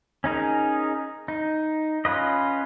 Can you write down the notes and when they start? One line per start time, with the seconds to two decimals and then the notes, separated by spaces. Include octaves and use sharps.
0.24 C#4 D#4 G#4 A#4
1.28 D#4
2.05 C#4 F4 B4 D#5